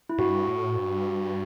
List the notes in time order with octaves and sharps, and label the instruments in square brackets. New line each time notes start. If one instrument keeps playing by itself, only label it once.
[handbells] E4
[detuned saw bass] G2 [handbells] F#4
[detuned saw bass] A2
G2